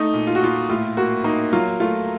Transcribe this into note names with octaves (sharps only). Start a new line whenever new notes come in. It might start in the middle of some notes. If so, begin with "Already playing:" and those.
Already playing: A3 D#4
A#2
F4
F#4
A#2 F4
A2 F4
A#3 F#4
A#3 D#4
F#3 F4
A3 F4